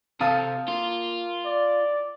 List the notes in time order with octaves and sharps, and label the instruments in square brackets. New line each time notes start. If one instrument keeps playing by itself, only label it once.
[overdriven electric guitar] C3 [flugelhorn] A4 [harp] F5 A5 D#6
[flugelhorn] A#3 [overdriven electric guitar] F4
[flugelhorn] D5